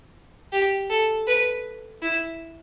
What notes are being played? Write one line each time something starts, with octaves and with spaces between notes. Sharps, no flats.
G4
A4
B4
E4